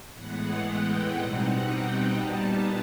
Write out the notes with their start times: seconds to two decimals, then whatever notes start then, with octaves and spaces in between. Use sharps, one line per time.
0.11 A2 E3 G#3 B3 F#5
0.62 G5
1.11 B2 G3 C4 D#4 F#5
1.61 G5
2.11 A#2 G3 B3 D#4 A5